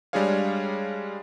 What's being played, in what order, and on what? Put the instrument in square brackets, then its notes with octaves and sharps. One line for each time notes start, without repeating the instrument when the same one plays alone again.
[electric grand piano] G3 G#3 D4 G#4 C#5 F5